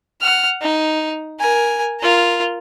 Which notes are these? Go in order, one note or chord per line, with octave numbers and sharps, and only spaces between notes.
F#5 F6
D#4
A#4 G#5
F4 A#4